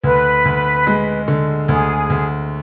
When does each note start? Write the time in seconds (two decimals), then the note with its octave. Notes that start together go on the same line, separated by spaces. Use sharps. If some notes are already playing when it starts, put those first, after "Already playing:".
0.03 D2 B4
0.45 D2
0.87 G#3
1.28 D3
1.68 D2 G#4
2.10 D2